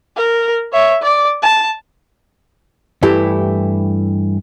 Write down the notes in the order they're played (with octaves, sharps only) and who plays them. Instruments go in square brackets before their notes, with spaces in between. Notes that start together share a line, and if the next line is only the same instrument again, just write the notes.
[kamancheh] A#4
C#5 E5
D5
A5
[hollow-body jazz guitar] G2 E3 A3 E4 G4